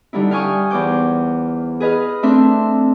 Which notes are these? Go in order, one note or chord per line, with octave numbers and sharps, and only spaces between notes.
D3 G3 D#4 E4
F5 G5 G#5 C#6 D#6
E2 C5 D6 G6
G#4 B4 D#5 F5
A3 C4 D4 E5 C6